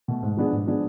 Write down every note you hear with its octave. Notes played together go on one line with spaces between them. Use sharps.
B2 A3
G#2
F3 B3 D4 G#4
G#2
F3 B3 D4 G#4